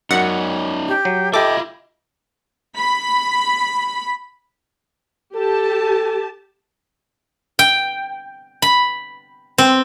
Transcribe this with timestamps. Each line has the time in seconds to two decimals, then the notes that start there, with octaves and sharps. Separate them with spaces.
0.11 F#2 C#4 D#4 F#5
0.88 G4
1.05 F#3
1.34 F4 G4 A4 D#5 E5 D6
2.78 B5
5.35 G4 A4 A5
7.59 G5
8.62 B5
9.58 C4